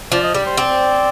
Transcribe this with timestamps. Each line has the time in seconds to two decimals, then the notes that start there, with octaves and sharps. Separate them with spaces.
0.12 F3 D5
0.23 D#5
0.34 G3 D5
0.46 C5
0.57 C4 D5